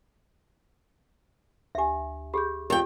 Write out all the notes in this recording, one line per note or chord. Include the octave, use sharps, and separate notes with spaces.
D2 G4 E5 G#5
G4 G#4 B5 G6
F2 G4 G5